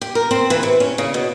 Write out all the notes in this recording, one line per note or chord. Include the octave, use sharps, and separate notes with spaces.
G4
A#4
C4
E3
C3
C#4
C#3
B2